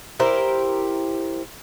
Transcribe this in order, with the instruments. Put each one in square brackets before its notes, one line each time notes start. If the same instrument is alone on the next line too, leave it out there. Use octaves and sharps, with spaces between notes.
[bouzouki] E4 G4 A#4 C5